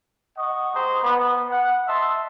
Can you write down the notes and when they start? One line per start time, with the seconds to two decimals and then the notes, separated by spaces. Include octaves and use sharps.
0.37 D#5 F#5 C#6 D#6
0.74 G#3 G4 C5 A#5 D#6
1.02 B3
1.50 F#5
1.88 D#5 E5 A5 C6